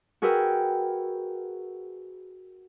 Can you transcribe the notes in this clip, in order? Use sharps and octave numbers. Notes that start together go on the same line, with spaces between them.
F#4 G#4 A#4 B4 G5 E6